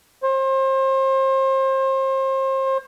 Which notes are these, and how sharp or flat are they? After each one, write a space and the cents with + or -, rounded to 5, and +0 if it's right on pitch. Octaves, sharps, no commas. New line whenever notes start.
C5 +35